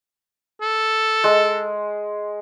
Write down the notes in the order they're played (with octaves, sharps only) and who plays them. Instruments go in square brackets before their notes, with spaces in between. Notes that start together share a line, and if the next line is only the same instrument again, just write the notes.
[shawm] A4
[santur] G#3